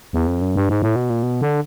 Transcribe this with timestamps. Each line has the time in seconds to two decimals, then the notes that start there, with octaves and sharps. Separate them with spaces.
0.13 E2
0.27 F2
0.42 F#2
0.55 G2
0.69 G#2
0.82 A2
0.96 B2
1.10 A#2
1.23 B2
1.41 D3